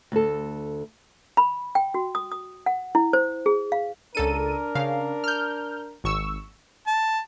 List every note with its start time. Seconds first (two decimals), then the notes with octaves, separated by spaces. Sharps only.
0.12 D2 A4
1.37 B5
1.75 G5
1.94 F#4
2.15 D#6
2.32 D#6
2.66 F#5
2.95 E4
3.13 C5
3.46 G#4
3.72 F5
4.15 C#2 D4 A4 A#4 D#7
4.75 C#3 F5
5.24 F6 G6
6.04 G#1 C#6 E6
6.87 A5